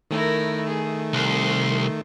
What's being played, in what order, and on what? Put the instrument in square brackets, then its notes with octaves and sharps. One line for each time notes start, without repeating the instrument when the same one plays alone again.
[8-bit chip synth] D#3 A3 [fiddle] E4 A#4
[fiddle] G#4
[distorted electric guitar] C2 [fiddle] C6